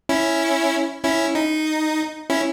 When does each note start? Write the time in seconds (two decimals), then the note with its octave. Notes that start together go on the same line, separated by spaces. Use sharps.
0.09 C#4 E4
1.04 C#4 E4
1.35 D#4
2.30 C#4 E4